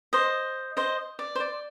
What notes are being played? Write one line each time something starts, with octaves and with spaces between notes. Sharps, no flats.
C5 D#5
C5 D#5
D5
C5
D5